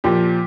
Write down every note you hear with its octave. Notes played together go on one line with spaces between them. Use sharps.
A#2 F3 G4